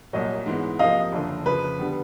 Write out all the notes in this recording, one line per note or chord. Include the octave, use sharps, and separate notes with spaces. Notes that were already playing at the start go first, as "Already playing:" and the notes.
C2 A#2 F#3 C#5 D#5
G#2 E3 G#3 B3
C3 F3 A#3 D#5 F5
F#1 F2 D3
F2 C#3 F3 B4
D3 G3 B3